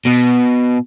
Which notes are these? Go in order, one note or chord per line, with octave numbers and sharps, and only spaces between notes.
B2